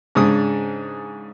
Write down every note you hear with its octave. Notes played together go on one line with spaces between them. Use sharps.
G#2 C#3 D4 D#6